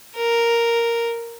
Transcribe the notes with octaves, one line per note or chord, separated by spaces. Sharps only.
A#4